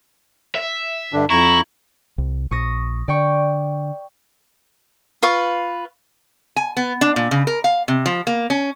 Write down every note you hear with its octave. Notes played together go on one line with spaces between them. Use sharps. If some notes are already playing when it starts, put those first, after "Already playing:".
E5
G2 D3 D4
F2 E4 A#5 C#6
C2
A#1 C#6 D#6 A#6
D3 D5 G5 C#6
F4 B4 F5 C#6
G#5
B3
D4
A#2
C#3
A#4
F5
C3
F3
A#3
C#4